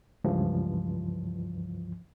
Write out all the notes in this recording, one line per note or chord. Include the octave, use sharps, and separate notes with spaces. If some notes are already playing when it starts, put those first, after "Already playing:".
C#2 G2 E3 F3